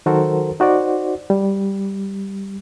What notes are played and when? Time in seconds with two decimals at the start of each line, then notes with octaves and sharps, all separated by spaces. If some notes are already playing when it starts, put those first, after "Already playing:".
0.06 D#3 F#3 F#4 A4 A#4 C5
0.60 D#4 F#4 C5 D5
1.30 G3